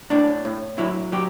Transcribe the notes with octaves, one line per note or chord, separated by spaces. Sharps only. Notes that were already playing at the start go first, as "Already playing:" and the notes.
A2 D4
A2
F#3 E4
F#3 G4